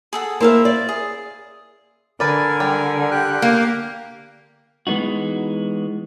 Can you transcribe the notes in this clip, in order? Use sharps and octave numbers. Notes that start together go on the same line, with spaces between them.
G#4 A4 F#5
A#3 E4 A#4 C5 E5 F5
D5
G#4
D3 A#4 B4 D5 G#5
G3
G4 G5 F#6
A#3
E3 G#3 B3 D#4 F#4